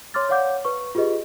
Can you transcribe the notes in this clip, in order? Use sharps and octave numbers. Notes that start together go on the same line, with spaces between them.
C#5 C6 D6 F6 A6
C#5 D5 F5 F#5 D6 G6
B4 C#6
F4 G4 G#4 B4 D#5